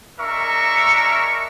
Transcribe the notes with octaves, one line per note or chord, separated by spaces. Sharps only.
G#3 D4 A#4 E5 A#5 C#6